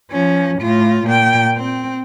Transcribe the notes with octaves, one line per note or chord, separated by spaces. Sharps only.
F3 C#4
A2 F4
A#2 G5
C4